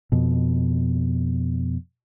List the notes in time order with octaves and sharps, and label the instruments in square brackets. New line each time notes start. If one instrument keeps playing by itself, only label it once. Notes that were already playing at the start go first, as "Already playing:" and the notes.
[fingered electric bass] F2 B2